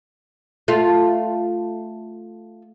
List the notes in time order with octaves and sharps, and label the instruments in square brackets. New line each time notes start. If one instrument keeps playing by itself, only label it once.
[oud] A3 F4